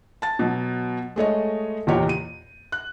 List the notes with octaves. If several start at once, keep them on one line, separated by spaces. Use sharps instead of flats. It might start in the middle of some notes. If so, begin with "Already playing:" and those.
A5 A6
B2 F#3
G#3 A3 C#5 D#5
F#1 E2 A#2 G4 C#5
D#7
F#6